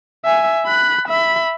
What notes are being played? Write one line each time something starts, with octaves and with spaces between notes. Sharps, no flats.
E5 G#5
B5 F#6
E5 B5